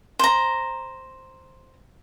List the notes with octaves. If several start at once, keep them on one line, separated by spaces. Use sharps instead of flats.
C5 A#5